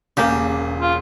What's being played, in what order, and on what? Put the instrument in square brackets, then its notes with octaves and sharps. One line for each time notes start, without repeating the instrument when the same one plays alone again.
[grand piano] E1 [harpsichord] C#3 [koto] A#3 G4
[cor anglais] F4